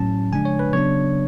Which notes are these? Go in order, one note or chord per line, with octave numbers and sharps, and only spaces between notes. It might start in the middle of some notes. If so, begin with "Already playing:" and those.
Already playing: A2 F#3 C#4 A5
C#3 F3 G#3 D4 G#5
C#5
B4
C#3 F#3 B3 D4 C#5